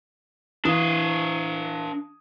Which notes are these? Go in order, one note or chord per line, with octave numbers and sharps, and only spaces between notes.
E3 D4 F5 D#6